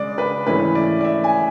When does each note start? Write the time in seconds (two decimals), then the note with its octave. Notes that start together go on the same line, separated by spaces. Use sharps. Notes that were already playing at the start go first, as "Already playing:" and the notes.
Already playing: C#3 G#3 D5
0.18 B4
0.46 G#2 E3 A3 C#4 E4 B4
0.75 D5
1.01 D5
1.05 E5
1.24 G#5